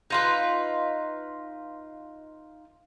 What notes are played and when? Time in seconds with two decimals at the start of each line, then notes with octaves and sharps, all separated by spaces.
0.10 D#4 F4 B4